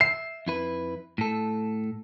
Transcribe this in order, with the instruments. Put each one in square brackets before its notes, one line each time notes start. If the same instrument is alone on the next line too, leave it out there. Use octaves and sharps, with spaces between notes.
[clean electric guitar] E5 [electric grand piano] C7
[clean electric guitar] F2 E4 B4
A2 A4